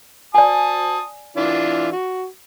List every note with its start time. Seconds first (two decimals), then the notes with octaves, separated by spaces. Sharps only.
0.35 D5 G#5 A5 D#6
1.37 E3 D4 F4
1.92 F#4